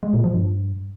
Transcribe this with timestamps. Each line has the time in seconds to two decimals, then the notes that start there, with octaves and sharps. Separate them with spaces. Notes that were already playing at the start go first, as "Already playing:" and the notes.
0.03 G#3
0.13 A#2
0.24 F3
0.34 G2